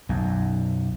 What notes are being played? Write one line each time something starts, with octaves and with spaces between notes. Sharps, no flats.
B1 F#2